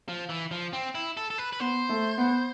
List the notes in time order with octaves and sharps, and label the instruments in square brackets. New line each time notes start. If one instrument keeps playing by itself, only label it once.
[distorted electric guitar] F3
E3
F3
C4
E4
A4
A4
B4
B4
[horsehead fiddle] B3 [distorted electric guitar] C5
[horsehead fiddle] A3
B3